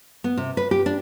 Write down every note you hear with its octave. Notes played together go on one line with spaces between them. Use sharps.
B3
C3
B4
G4
D4